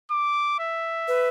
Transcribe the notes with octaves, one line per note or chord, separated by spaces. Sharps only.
D6
E5
B4